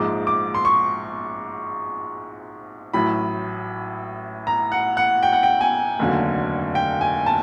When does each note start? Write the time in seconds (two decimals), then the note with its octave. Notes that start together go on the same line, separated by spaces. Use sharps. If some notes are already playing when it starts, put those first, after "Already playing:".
Already playing: A#1 G#2 F3 G#3 D6
0.27 D6
0.55 C6
0.65 C#6
2.94 A1 A2 F#3 B5
4.47 A#5
4.72 F#5
4.97 F#5
5.23 G5
5.33 F#5
5.43 G5
5.61 G#5
5.99 F1 D#2 D3 F#3
6.75 G5
7.01 G#5
7.26 A5